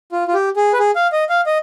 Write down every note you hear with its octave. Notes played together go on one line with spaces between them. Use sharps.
F4
F4
G4
G#4
B4
G#4
F5
D#5
F5
D#5